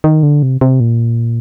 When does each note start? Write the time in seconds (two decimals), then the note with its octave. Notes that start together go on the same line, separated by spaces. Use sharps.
0.04 D#3
0.23 D3
0.43 C3
0.61 C3
0.80 A#2